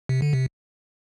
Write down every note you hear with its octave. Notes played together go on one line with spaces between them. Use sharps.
C3
D3
C3